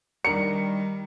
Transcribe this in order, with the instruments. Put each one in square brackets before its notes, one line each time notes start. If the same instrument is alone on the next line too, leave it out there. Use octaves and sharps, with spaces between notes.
[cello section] D#3 G3 [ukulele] D4 A#4 A#5 [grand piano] C#7